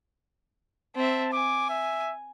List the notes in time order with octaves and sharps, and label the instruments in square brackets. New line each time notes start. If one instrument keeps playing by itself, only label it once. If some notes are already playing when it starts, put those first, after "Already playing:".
[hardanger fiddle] C4 E5 [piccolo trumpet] A5
[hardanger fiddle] G#5 [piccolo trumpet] D6
[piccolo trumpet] E5